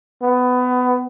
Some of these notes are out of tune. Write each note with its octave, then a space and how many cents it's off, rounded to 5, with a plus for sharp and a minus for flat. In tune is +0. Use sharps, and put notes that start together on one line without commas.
B3 +20